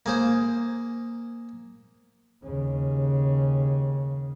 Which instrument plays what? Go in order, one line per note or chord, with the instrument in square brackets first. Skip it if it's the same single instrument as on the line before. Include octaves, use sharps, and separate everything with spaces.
[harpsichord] A#3 G#4 C5
[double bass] D#2 C#3